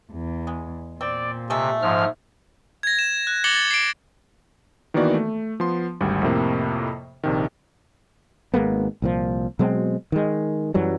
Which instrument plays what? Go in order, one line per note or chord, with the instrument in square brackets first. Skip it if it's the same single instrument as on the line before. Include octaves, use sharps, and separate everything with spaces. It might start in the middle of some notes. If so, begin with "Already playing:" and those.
[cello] E2
[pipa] G#3
[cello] A#2 [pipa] C4 [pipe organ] D5
[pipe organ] C3 [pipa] G#3 A3
[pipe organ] G#2 F3 F6
[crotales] G#6 A#6
E7
F#6
D6 A6 A#6 C#7 F#7 G7
A6
C7 D7
[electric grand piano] D#3 E3 A#3 B3 F#4 D5
A3
F3 B3 C6
G#1 D2 G3
F2 A2 C3 A#3
A#1 C3 D#3
[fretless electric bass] G#1 G#3 A#3 B3
C2 A#2 F3
B2 F#3 G#3 C4
D#3 G#3
F#2 E3 F#3 G3